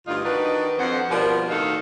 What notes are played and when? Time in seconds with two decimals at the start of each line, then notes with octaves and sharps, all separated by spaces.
0.07 D2 G2 D#4 F4
0.24 D#3 D4 D#4 F#4 B4
0.78 F2 C5 F#5
1.09 B2 F3 G3 D4 A#4
1.50 A2 D#3 D#4 F4 F#4 A4